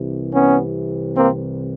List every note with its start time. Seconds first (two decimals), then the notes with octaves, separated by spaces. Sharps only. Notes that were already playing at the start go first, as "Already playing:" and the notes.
Already playing: C2 C3 E3
0.33 B3 C#4
1.15 A#3 C4